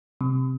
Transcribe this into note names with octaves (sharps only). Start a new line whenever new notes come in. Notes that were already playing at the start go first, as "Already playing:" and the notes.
C3